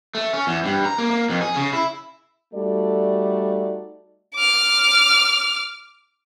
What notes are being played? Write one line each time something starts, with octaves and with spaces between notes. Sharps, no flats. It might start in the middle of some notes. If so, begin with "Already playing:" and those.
A3
C#4
E2
G2
A#5
A#3
A#3
F2
G#4
C#3
E4
G3 A3 D#4 F#4 A4 D5
D6 F6